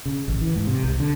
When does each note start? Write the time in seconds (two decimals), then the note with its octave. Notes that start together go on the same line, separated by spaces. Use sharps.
0.06 C#3
0.28 A1
0.41 E3
0.56 G#2
0.67 C3
0.83 C2
1.00 D3